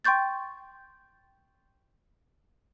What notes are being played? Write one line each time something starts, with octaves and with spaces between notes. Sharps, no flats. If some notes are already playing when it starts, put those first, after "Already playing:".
G5 C6 C#6 G6 A6